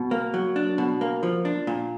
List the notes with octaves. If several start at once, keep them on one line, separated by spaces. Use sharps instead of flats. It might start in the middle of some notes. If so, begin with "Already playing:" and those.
Already playing: B2
A#3
F#3
D4
B2
A#3
F3
D4
A#2